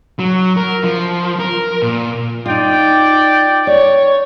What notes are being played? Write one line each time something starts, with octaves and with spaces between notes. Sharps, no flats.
F#3
A#4
F3
A#4
A#2
D#4 F4 D5 G5
C#5 D5